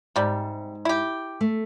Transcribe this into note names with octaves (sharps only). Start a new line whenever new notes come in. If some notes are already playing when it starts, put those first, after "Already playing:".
G#2 C3 G3
E4 G4
A3